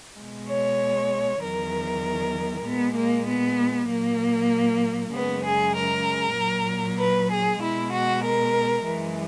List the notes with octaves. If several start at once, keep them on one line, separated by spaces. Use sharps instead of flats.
B2 G#3
C#5
E2 D#3 F#3 A#4
A#2 G#3 B3
A#3
B3
A#2 F#3 A#3
F#2 C#3 G#3 B3
G#4
A#4
A#2 F#3
B4
G#4
B2 G#3 E4
F#4
A#4
F#2 E3 G#3